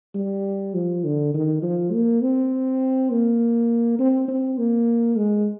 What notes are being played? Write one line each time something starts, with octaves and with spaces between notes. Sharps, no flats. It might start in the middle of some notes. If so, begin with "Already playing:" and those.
G3
F3
D3
D#3
F3
A#3
C4
A#3
C4
C4
A#3
G#3